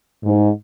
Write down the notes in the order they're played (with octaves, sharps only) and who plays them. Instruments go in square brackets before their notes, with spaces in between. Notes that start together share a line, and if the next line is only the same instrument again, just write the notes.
[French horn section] G#2